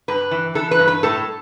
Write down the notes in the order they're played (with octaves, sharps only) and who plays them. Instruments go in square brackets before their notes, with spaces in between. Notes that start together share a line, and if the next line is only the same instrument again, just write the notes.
[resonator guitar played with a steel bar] G2 B4
E3
E3 A4
B4
G2
B4
A2 A4